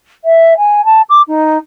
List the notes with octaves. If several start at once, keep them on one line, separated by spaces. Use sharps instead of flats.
E5
G#5
A5
D6
D#4